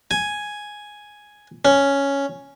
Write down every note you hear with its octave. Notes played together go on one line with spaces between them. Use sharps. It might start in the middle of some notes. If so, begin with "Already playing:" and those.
G#5
C#4